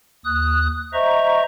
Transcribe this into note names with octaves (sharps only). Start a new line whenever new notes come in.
D#2 D#6 F#6
C5 D#5 E5 A#5 C#6